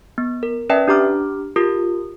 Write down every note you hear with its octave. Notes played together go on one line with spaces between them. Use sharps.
B3
A#4
C#4 B4 D5 E5 G5 A5
D4 G4 A#5 D6 F6
F4 G4 A#4 D#6